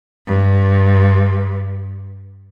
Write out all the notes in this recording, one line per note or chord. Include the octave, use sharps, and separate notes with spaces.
G2